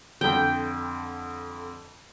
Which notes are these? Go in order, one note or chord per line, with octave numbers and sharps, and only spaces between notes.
F2 D3 G5